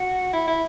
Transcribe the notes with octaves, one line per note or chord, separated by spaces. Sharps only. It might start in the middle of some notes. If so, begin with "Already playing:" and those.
Already playing: F#4
E4
E4